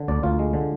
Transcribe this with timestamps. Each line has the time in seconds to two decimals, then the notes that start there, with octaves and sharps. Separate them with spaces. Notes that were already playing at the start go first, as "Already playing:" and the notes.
Already playing: D3
0.08 D2 D5
0.23 D2 F4
0.39 G#3
0.54 D3